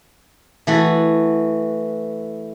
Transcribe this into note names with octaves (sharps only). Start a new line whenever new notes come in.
E3 A3 F#4 A4